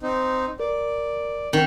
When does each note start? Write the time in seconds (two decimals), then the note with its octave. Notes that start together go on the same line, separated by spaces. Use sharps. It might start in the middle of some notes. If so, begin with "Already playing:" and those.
0.03 C4 D#4
0.60 A#4 D5
1.53 D#3 C4